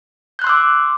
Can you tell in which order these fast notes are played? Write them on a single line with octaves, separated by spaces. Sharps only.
G6 F#6 C6 E6 D6